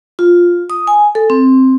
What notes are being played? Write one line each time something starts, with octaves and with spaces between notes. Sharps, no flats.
F4
D#6
G#5
A4
C4